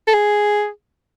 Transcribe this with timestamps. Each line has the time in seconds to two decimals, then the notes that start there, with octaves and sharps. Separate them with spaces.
0.08 A4
0.14 G#4